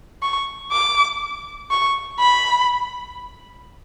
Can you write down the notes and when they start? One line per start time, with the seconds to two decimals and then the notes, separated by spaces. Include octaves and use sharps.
0.22 C#6
0.72 D6
1.71 C#6
2.19 B5